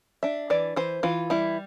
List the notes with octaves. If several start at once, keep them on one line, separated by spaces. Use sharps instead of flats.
D4 E5
E3 D5
E3 C5
E3 F4
G3 E4